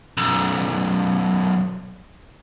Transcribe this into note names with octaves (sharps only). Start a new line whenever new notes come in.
B1 F#2